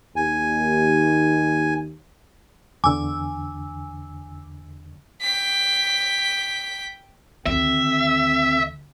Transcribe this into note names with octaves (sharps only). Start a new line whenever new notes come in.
D#2 G#5
E2 D3 G#5 D6 E6
G5 B6
D2 D3 D#3 C4 E5